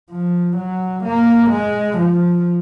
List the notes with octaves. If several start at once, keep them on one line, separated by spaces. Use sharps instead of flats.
F3
F#3
A#3
G#3
F3